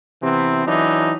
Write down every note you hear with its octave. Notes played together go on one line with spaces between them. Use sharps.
C3 E3 B3 C4
E3 F#3 D4 D#4